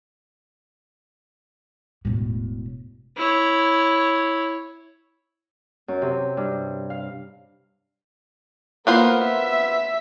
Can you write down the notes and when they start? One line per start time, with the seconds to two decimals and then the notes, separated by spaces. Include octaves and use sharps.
2.05 E1 A2
3.17 E4 C#5
5.88 F#2
6.02 C3
6.37 G2
6.90 F5
8.87 A#3 B3 F4 C5
9.24 E5